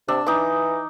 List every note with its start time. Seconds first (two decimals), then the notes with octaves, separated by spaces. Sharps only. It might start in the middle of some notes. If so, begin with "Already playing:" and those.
0.08 C3 D4 E6
0.26 E3 D#4 D6